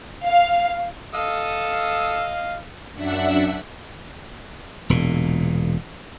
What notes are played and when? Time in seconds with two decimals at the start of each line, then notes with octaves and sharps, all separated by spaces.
0.24 F5
1.14 A4 D#5 F5 D#6 E6
2.94 F#2 D4 E5 F#5 E6
4.90 E1 A#2